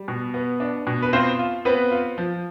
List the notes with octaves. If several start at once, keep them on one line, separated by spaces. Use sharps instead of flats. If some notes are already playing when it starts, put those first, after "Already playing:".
Already playing: G3
B2
B3
D4
B2
B4
C4 F4 C5
F4
B3 C4 B4
F4
F3